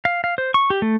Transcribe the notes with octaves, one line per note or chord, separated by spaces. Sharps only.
F5
F5
C5
C#6
G4
A3